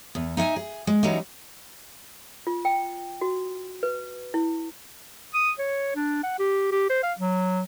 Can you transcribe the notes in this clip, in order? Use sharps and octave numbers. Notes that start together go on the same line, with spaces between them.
E2
D#4 E5 F#5 G#5
G#4
G#3
E3 F#3 G3 C#4 D#4
F4
G5
F#4
B4
E4
D#6
C#5
D4
F#5
G4
G4
C5
F5
F#3